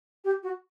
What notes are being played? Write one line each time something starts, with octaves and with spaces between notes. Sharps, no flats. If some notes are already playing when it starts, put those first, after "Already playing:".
G4
F#4